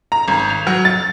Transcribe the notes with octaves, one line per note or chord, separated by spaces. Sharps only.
A#5
G#1
F7
F#3
A6